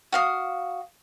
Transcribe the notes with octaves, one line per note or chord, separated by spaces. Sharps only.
F#4 F5 D#6